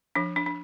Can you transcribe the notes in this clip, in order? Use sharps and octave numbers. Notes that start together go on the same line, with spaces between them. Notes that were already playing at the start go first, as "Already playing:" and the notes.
F3 D4
D4
D4